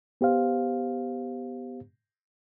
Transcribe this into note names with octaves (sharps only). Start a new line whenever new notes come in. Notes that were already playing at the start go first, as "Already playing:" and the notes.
B3 G4 C5 F5